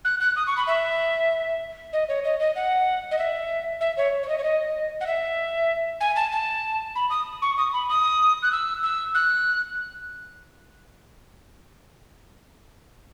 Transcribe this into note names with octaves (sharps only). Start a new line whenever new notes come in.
F#6
F#6
D#6
C#6
B5
E5
D#5
C#5
D#5
D#5
F#5
D#5
E5
E5
C#5
C#5
D#5
C#5
D#5
F#5
E5
G#5
A5
A5
B5
D#6
C#6
D#6
B5
D#6
F#6
E6
E6
F#6